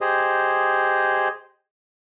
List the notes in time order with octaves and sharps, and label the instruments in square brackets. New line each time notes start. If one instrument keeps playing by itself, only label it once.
[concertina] G4 G#4 C5 D#5